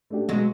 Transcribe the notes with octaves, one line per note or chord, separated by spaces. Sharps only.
A3 D4 G4
B2 F#3 G#3